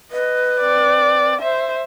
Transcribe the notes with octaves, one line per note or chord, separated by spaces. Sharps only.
B4 D#5
C4 D5
C5 E5